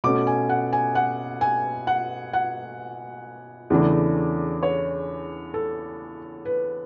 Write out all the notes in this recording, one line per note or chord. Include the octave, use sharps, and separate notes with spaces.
B2 A3 C#4 D6
G#5
F#5
G#5
F#5
G#5
F#5
F#5
E2 C#3 E3 A3 D4
C#5
A4
B4